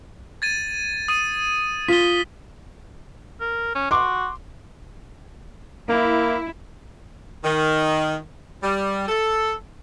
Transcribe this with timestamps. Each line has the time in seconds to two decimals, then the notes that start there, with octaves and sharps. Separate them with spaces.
0.42 G#6 A6 D#7
1.08 D#6 D#7
1.88 F4 B6 G7
3.41 A#4
3.75 C#4
3.91 F#4 C6 D6
5.89 A#3 E4
7.44 D#3
8.62 G3
9.08 A4